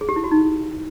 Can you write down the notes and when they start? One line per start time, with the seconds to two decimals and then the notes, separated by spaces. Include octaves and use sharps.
0.01 G#4
0.09 G4
0.16 E4
0.24 F#4
0.31 D#4